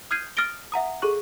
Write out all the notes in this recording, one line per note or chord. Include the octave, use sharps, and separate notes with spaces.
D#6 F6 G6 G#6 C7 D#7
D#6 F6 A6 A#6 D7 G7
E5 F#5 A#5 D#6
G#4 A4 C#6 F#6